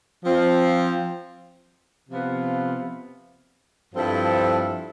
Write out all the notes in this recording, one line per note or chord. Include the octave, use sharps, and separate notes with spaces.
F3 C4 F4
C3 F3 B3 F4 B4
G2 F3 C4 E4 A4